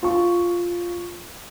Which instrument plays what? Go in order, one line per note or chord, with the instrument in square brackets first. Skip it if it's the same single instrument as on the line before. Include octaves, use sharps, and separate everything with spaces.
[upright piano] F4 C#6